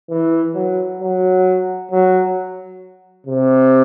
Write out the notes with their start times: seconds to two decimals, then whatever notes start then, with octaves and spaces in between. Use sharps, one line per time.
0.10 E3
0.55 F#3
1.01 F#3
1.91 F#3
3.27 C3